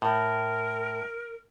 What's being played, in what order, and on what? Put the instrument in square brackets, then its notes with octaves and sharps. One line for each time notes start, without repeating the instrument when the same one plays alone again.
[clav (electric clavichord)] A2 [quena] A#4